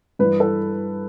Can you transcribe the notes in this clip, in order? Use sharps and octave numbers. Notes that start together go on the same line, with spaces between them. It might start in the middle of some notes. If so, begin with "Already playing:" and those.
G2 E3 B4
A4